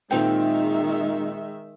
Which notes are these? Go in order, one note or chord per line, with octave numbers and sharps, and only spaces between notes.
A#2 D#3 G#3 C4 D#4 E5 G5